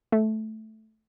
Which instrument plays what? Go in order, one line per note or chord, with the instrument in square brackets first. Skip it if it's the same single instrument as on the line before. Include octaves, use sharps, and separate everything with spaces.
[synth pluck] A3